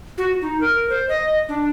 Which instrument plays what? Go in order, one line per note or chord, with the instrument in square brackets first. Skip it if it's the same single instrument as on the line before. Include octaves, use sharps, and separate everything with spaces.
[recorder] F#4
D#4
A#4
C5
D#5
D4